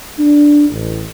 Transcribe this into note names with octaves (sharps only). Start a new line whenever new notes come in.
D4
A1